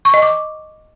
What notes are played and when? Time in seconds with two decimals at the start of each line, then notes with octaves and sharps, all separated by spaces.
0.05 C#6
0.14 D#5
0.22 D6